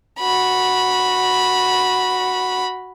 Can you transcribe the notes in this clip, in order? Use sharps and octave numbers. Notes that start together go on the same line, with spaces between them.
F#4 B5